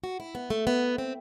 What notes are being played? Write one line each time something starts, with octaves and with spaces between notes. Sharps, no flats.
F#4
E4
B3
A3
B3
C4